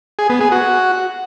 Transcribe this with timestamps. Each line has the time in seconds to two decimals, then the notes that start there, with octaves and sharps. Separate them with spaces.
0.19 G#4
0.30 B3
0.41 G#4
0.52 F#4